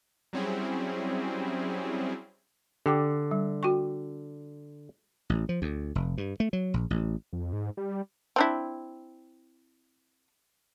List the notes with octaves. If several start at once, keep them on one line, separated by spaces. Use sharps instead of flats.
F#3 G3 C4 C#4 E4 G#4
D3 G4 G5 D6
G3
F#4 G5 C#6
A1
F3
D2
F1
G2
A3
F#3
A#1
A1
F2
G#2
G3
C4 D4 E4